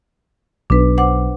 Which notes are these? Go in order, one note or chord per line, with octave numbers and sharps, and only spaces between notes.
B1 D4 B4
C5 F#5 D6